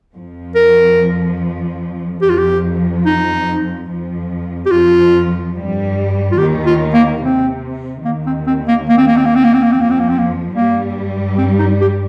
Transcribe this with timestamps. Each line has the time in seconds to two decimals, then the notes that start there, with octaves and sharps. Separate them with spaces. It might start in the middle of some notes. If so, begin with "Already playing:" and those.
0.14 F2 F3
0.55 A#4
2.22 F2 F3 G4
2.30 F4
2.38 G4
3.06 D#4
3.89 F2 F3
4.66 G4
4.72 F2 F3 F4
5.55 G2 G3
6.32 F4
6.38 D#2 D#3 G4
6.66 F4
6.94 A#3
7.22 C3 C4
8.05 D#2 D#3 A#3
8.27 C4
8.47 C4
8.68 A#3
8.89 A#3
8.98 C4
9.07 A#3
9.17 C4
9.26 A#3
9.36 C4
9.45 A#3
9.54 C4
9.63 A#3
9.72 F2 F3 C4
9.81 A#3
9.91 C4
10.00 A#3
10.09 C4
10.18 A#3
10.55 G2 G3 A#3
11.38 C4
11.59 D#4
11.81 G4